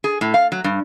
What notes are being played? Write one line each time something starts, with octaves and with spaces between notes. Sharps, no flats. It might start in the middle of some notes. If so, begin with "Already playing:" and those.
G#4
A2
F5
F#3
G2